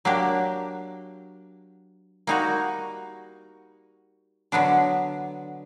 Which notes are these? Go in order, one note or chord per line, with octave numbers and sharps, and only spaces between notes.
F#3 A#3 D4 G4
G3 A#3 D#4 F#4
D3 F#3 B3 D4